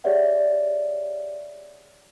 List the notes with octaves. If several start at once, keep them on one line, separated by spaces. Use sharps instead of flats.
G4 G#4 C#5 D5 E5 F#5